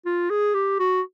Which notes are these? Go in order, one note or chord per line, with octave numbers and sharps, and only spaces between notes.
F4
G#4
G4
F#4